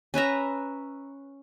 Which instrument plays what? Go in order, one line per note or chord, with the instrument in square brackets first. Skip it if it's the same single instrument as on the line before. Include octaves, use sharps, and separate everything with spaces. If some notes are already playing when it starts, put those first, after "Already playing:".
[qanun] C#4 B4 E5 A#5